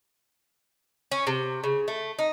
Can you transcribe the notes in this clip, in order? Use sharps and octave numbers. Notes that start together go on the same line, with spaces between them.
C#4
C3
C#3
A3
D#4